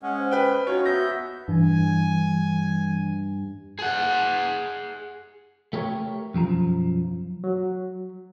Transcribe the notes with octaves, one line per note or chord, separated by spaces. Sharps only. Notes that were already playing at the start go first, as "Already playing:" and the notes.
G#3 C#4 F#5
C5
B4 G5
C#4 D#4 F4 F#4 C#5
B3 E5 G6 A#6
G2 E3 G#5
G#4 F#5
A3 G4 A#4 C#5
B1 F#2 F3 A#5
F#3